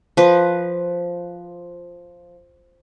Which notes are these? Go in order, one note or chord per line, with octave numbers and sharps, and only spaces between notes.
F3 B4